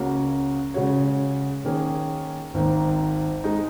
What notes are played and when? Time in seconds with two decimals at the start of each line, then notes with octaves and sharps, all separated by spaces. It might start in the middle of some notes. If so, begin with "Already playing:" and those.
Already playing: C#2 C#3 A#3 F#4 C#5
0.74 C#3 G#3 F#4 C#5
1.65 D#3 A#3 C#4 G#4
2.54 G#1 G#2 D#3 A#3
3.44 G#3 D#4